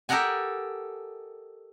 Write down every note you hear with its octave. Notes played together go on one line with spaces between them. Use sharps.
G4 A4 A#4 D#5 F#5 G#5